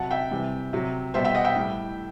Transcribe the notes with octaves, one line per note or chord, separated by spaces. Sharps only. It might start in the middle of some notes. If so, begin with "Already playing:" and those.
Already playing: C3 F#3 F#5 A5
E5 G5
C3 E3 G3
C3 F#3
B2 G3 C5 E5
E5 G5
D#5 F#5
E5 G5
A2 G3